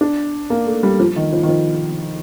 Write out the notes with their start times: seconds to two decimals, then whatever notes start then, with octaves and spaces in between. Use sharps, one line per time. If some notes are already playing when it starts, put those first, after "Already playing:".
0.01 D4
0.50 A#3
0.67 A3
0.83 G3
1.00 F3
1.16 D#3
1.32 F3
1.43 D#3
1.49 F3